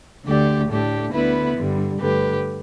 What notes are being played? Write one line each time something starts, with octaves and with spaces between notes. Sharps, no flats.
D2 D3 A3 G4 D5
A2 A3 D4 G4
D2 D3 B3 E4 B4
G2 D3 G3
G2 D3 A3 G4 B4